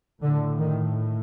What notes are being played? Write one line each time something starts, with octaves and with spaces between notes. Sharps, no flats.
A2 D3
D#3